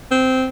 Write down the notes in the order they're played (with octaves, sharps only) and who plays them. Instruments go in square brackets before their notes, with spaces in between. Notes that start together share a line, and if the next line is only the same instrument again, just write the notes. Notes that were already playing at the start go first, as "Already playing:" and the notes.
[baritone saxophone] C4